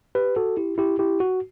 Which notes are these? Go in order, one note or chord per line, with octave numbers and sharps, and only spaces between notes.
G4 B4
F#4 A4
E4 G4
E4 G4
E4 G4
F#4